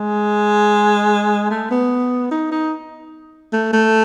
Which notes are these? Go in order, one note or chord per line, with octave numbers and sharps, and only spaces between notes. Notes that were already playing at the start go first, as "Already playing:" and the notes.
Already playing: G#3
A3
B3
D#4
D#4
A3
A3